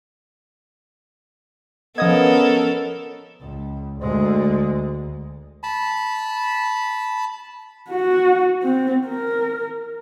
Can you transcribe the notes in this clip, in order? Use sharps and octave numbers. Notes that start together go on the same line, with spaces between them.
F3 B3 C#4 A4 A#4 D#5 D#6 G#6
C#2
D2 G#3
A5 B5
F#4
C4
A#4